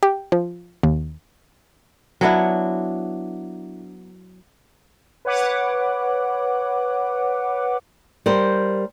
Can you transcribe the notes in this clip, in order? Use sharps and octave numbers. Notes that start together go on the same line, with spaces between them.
G4
F3
D#2
F#3 B3 D4 E4
B4 C#5 F#5 D6
G3 A#4 C5